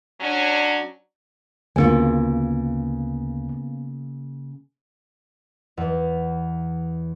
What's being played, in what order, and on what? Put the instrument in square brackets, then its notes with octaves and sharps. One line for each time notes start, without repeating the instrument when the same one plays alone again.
[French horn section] F#3 C#4 D4
[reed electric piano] D2 [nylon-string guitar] C#3 A#3 F4 [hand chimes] B3 G#5
[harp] E2